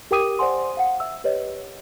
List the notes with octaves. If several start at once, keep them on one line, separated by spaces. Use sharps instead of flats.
G4 A#4 G5 D6 D#6 D#7
C5 D5 F#5 G#5 C6
F5 F#5
E5 E6
G4 B4 C#5 D#5